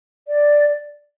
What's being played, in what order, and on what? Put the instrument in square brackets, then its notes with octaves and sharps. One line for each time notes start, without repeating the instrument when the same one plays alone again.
[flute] D5